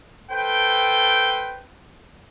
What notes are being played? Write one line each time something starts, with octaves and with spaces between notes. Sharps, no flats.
A4 B4 C5 G5